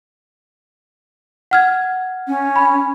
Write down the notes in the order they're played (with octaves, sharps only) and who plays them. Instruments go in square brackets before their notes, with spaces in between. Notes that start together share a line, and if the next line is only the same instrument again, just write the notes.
[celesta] F#5 F6 G#6
[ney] C#4
[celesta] B5